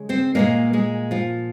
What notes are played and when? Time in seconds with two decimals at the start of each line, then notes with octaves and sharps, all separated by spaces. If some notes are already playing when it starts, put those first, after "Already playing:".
Already playing: C#3 G#3
0.09 C4 C5
0.35 A#2 F3 G#3 A#3 A#4
0.73 G#3 G#4
1.11 F3 F4